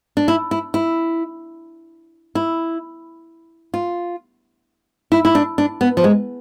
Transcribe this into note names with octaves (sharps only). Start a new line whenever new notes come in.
D4
E4
E4
E4
E4
F4
E4
E4
D4
D4
B3
F3
G#3